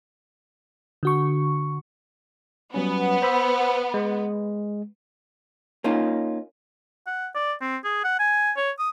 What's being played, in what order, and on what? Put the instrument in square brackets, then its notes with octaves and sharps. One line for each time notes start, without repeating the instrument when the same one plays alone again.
[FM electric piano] D3 F#4 C#6
[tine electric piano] F#3 G3 C#4 [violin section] B3
[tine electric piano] C5 B5 E6
G#3
[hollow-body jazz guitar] A#3 C#4 D#4 F4
[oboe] F#5
D5
C4
G#4
F#5
G#5
C#5
D#6